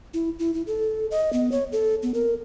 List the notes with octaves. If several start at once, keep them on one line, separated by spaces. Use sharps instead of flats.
E4
E4
E4
A4
D#5
B3
C#5
A4
B3
A#4